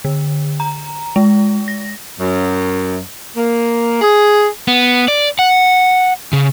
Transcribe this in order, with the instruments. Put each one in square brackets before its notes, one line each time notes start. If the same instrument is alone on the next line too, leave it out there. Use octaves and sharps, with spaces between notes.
[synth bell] D3
A#5
G#3
A#6
[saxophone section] F#2
A#3
G#4
[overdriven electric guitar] B3
D5
F#5
C#3